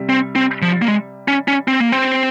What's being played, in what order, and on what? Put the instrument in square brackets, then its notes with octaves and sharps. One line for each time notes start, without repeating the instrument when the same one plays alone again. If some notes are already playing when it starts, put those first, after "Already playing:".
Already playing: [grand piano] C3 G3
[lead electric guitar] C4
C4
F3
A#3
G#3
C#4
C#4
C4
A#3
C4